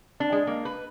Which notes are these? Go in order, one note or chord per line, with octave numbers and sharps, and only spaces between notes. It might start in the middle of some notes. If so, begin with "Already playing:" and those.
D4
G#3
A#3
B4